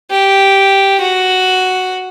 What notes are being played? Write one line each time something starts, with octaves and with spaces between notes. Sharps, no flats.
G4
F#4